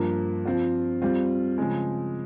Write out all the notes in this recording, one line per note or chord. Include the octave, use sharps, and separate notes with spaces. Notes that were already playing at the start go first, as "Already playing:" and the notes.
Already playing: G2 F3 A#3
F3 C4 F4
G3 C4 F4
C#3 F3 G#3